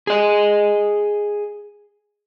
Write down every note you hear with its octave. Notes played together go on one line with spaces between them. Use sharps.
G#4 D#5